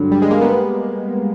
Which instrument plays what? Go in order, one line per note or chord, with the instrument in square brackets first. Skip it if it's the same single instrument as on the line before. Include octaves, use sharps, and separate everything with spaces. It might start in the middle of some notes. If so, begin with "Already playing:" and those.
Already playing: [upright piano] G2 D3 F#3
[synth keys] G3
G#3
A#3
B3